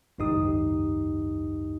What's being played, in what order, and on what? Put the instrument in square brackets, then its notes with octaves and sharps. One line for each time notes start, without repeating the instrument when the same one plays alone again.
[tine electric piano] G#1 C#2 F#2 D#4 G4 D#6